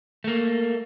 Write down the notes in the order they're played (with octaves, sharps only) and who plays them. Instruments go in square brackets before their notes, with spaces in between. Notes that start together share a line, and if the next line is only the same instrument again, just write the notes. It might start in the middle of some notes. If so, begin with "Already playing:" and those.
[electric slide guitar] A3 A#3